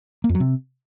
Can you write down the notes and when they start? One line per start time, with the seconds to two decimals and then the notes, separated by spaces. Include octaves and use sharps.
0.24 A#3
0.29 F2
0.35 F#3
0.40 C3